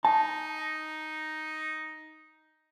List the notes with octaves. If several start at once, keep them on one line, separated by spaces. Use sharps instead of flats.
D#4 A5